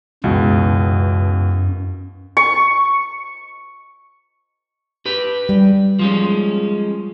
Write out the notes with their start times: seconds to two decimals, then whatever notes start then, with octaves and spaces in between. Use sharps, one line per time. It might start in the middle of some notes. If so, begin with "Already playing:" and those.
0.24 C#2 F#2 B2 E3
2.37 C#6
5.06 G4 B4
5.49 G3
5.99 F3 G#3 C#4